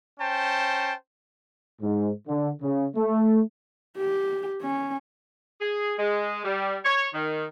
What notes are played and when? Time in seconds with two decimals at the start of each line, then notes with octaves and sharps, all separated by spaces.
0.20 C#4 C5 G5 A5
1.82 G#2
2.28 D3
2.62 C#3
2.96 A3
3.98 G4
4.62 C#4
5.61 G#4
5.98 G#3
6.44 G3
6.85 C#5
7.14 D#3